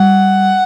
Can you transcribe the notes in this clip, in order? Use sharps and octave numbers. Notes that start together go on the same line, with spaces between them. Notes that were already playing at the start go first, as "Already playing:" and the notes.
Already playing: G3 F#5